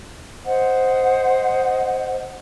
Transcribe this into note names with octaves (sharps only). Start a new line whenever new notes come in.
C5 D#5 F#5